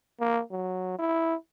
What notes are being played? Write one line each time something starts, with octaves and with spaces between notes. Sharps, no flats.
A#3
F#3
E4